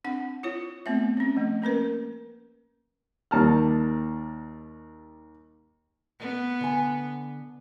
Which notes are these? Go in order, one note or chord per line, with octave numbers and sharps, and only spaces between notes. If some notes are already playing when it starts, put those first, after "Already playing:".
C4 D4 F#5
E4 F4 C#5
A3 B3 C4 E5
C4 C#4
F3 A3
A#3 C#4 A#4 B4
D#2 G3 A5 A#5 F6
B3
D3 G#5